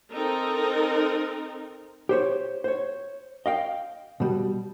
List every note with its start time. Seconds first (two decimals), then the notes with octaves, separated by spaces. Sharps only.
0.12 C4 D#4 A4 A#4
2.09 G4 C5 C#5
2.64 C5 C#5
3.46 D#5 F5 G5
4.20 B2 G3